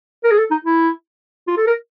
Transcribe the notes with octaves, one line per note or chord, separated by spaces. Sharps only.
A#4
G#4
A4
D#4
E4
F4
A4
A#4